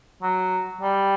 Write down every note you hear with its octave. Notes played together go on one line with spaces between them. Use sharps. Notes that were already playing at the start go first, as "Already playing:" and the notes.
F#3
G3